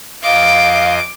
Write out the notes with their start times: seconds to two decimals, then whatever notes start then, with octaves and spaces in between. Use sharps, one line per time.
0.23 F2 D#5 F5 C6 D6